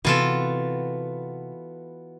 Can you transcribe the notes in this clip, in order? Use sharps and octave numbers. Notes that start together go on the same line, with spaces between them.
C3 E3 B3 C4 F4 F#4 A4